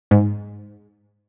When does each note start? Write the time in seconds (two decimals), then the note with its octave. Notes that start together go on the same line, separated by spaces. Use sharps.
0.11 G#2